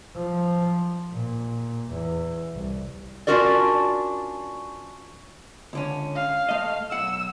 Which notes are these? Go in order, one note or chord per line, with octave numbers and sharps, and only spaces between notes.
F3
A#2
E2
C2
C#4 D4 F4 F#4 A#4 D5
C#2 D3 C#4
F5
A3 D#5
B1 F#5 E6